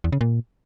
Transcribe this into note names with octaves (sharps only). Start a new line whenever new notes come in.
E2
C#3
A#2